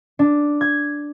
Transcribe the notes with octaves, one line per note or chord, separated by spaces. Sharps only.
D4
G#6